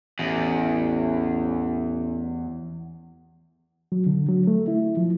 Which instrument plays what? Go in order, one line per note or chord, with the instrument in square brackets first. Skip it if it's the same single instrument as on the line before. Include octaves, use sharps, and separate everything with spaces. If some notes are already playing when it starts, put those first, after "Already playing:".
[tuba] A1 [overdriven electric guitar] E2
[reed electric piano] F#3
D3
F#3
A3
E4
F3